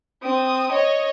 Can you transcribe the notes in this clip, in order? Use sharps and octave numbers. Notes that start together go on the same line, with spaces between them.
C4 D#6
C#5 D#5